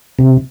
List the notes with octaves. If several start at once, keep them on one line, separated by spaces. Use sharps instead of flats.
C3